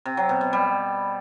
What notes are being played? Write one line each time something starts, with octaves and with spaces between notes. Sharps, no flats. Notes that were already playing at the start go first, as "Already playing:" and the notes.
C3
F#3
B2
B2
G3